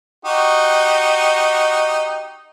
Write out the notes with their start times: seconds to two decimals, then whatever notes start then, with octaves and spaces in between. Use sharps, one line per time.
0.25 D#4 F#4 G4